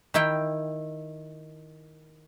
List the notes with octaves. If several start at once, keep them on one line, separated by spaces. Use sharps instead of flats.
D#3 D#4 E4 G5